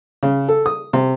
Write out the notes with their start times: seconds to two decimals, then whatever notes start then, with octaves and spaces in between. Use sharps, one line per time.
0.23 C#3
0.49 A4
0.66 D#6
0.93 C3